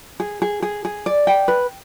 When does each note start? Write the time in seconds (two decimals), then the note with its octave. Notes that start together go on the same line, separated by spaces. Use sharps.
0.20 G#4
0.42 G#4
0.62 G#4
0.85 G#4
1.06 D5
1.27 G5
1.48 B4